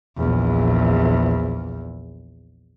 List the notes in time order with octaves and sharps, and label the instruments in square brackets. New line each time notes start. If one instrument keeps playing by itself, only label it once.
[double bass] A#1 E2